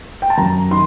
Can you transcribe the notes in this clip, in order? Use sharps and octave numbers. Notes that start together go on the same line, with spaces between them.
G5
A5
F#2 A#5
D#3 C6